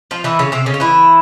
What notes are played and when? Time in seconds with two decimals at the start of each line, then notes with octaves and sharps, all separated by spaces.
0.11 F3 F4
0.24 E3 E4
0.39 C#3 C#4
0.52 C3 C4
0.66 C#3 C#4
0.74 F4
0.80 E3 E4